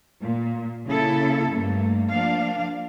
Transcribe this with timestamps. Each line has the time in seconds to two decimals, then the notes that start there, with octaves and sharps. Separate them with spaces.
0.22 A#2
0.87 C#3 A#3 E4 A4
1.51 G2 A3 A#3
2.09 F3 A#3 D4 F5